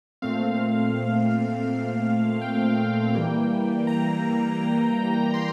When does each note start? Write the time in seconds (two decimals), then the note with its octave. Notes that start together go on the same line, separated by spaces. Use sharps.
0.22 A#2 A3 C4 F5
2.41 G5
3.14 E3 G3 A#3
3.87 A#5
5.34 C6